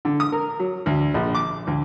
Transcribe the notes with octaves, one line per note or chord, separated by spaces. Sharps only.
D3
D#6
A#4
F#3
D2
A#1
D6
D2